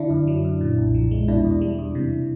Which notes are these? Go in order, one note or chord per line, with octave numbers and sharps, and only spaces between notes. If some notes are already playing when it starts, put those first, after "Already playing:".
Already playing: D3 D4 E4
F#2
F#3
F#2
A#2
B1
F3
G#3
B2 D4 E4
E2
G3
E2
C3